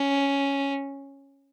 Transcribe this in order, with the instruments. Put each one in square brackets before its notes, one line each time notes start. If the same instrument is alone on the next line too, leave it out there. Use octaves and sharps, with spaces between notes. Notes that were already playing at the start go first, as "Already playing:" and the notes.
Already playing: [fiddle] C#4